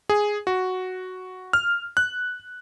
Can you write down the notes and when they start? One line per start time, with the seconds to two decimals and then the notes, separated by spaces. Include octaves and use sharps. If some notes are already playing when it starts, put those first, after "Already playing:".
0.09 G#4
0.47 F#4
1.53 F6
1.97 F#6